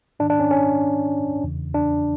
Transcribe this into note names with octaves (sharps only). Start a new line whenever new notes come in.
G#2 D#3 D4
D4
C#4
C#4
E2 C#3 E3
D4